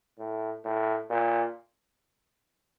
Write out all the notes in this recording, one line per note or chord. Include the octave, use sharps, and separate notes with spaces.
A2
A2
A#2